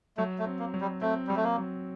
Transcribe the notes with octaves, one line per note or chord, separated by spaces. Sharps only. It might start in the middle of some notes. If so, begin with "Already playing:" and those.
F#3 A3
A3
C4
A#3
F#3
G3
A3 C4
F#3 G3
A3
A#3
F#3